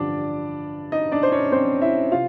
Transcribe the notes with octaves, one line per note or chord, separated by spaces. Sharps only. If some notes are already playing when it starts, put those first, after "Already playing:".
Already playing: A1 G2 D3 F3 D4 D5
D#4 D#5
D4 D5
C5
C#4 C#5
C4 C5
E4 E5
C3 F4 F5